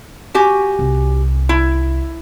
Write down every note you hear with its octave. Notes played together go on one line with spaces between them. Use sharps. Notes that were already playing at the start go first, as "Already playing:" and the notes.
F#4 G4 G#5
C2
E4